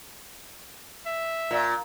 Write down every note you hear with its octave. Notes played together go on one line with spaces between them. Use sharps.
E5
A#2